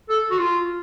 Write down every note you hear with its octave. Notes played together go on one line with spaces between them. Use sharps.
A4
F#4
F4